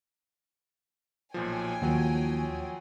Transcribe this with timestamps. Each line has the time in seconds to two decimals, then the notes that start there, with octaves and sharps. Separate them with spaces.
1.34 B1 A#2 F3 C#5 G5 G#5
1.82 D#2 F3 F#3